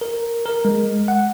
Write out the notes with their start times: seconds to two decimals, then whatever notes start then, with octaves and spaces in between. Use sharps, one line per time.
0.01 A#4
0.46 A#4
0.65 G#3
1.08 F#5